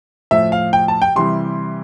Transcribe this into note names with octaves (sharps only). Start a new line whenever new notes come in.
A2 F3 E5
F5
G5
A5
G5
C3 E3 G3 C6